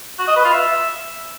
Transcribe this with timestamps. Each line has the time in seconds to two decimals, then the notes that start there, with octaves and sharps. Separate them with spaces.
0.19 F#4
0.27 D#5
0.36 B4
0.45 F4
0.53 E5